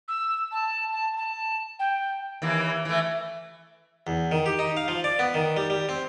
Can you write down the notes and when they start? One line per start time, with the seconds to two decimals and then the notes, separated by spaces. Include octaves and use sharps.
0.08 E6
0.51 A5
0.92 A5
1.17 A5
1.79 G5
2.42 D#2 E3 A#3
2.85 E3 A3
4.07 E2
4.32 D#3
4.46 G4
4.59 D#4
4.77 F5
4.88 F3
5.04 D5
5.19 B3
5.34 D#3
5.57 G3
5.70 G3
5.89 C4